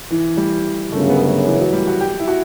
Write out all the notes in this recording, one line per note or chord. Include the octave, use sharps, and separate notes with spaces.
E3
G3
G1 F#2 C#3 A3
B3
B3
E3
F#3
G3
F#4
G4
E4
F#4